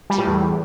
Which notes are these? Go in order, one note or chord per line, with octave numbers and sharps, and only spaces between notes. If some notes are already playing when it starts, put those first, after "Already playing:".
G3
A2
E2